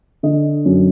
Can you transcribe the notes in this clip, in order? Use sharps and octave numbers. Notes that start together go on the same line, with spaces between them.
D3 D#5
F#2